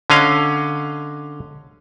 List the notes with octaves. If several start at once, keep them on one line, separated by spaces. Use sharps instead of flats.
D3 C#4 D#5 F5